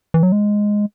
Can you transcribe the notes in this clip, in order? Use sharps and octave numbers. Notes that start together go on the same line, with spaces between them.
E3
F#3
G#3